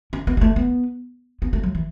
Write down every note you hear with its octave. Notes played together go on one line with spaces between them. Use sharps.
C#4
B3
G#3
A3
B3
B3
A3
F#3
E3